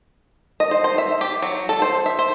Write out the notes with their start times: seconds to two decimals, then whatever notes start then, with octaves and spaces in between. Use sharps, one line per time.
0.60 D#5
0.71 C5
0.84 C5
0.98 E5
1.21 G4
1.42 F#3
1.69 A4
1.82 C5
2.06 E5
2.19 C5